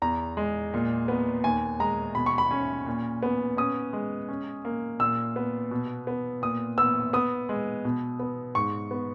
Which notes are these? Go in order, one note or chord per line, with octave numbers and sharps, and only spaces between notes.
E2 A#5
G#3
A#2
B3
D#2 G#5
G#3 A#5
B2 B5
C#6
B5
C#4
A#2
B3
C#4 D#6
G#3
C#4
A#3
A#2 E6
B3
B2
B3
A#2 D#6
B3 E6
B3 D#6
G#3
B2
B3
G#2 C#6
B3